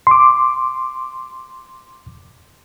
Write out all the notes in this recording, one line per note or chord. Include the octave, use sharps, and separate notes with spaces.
C6 D6